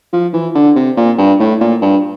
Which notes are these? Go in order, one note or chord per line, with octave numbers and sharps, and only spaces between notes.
F3
E3
D3
C3
A#2
G2
A2
A#2
G2